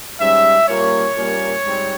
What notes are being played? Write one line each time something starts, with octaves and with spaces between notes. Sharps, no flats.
G#2 G3 C#4 E5
A#2 G3 A#3 C#4 C#5
A#2 G3 A#3 C#4
G#2 G3 C4